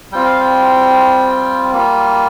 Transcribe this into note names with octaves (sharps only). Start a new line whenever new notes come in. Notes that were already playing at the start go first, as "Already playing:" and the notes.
G3 C4 F4 G5
F5
G5
G3 A#3 F4